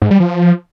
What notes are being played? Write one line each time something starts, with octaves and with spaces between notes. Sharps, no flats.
G#2
G3
F3